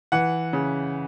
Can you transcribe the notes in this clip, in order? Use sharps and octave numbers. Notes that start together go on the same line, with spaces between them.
E3 F#5
C#3